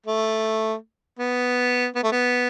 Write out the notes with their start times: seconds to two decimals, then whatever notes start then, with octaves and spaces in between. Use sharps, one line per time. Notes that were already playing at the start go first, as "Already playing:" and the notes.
0.06 A3
1.19 B3
1.95 B3
2.03 A3
2.12 B3